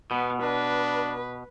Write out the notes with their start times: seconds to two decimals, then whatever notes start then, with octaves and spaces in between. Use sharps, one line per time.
0.11 B2 B3
0.43 D4 B4